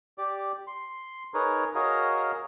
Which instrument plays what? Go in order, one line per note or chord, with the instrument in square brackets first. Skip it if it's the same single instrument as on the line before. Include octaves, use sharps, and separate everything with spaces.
[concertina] G4 D5
C6
D#4 G#4 A#4 B4 C#5
F#4 G#4 A#4 C#5 D#5 F5